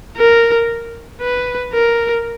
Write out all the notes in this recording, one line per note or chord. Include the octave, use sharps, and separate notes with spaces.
A#4
B4
A#4